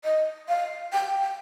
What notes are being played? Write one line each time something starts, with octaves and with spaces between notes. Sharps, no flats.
D#5
F5
G5
G5